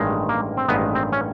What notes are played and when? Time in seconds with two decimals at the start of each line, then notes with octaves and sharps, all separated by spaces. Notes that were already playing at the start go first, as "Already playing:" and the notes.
Already playing: A1 G2 D#3 G#3
0.29 A#3
0.57 C4
0.68 A1 G2 D#3 G#3 B3
0.95 C4
1.12 C#4